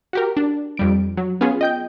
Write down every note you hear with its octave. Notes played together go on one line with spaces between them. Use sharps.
F#4 G4 A#4
D4
F2 G3 D7
F#3
B3 C#4 F4 G#4
D#5 G5 G6